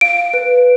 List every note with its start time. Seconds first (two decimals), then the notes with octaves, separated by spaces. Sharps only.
0.01 F5 D7
0.34 B4